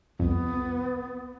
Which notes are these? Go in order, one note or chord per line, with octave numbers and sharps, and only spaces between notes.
C2 F2 B3